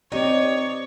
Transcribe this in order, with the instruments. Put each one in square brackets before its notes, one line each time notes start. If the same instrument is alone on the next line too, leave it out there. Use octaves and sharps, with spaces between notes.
[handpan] C4 G4 D5 [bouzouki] D#4 [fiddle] C#5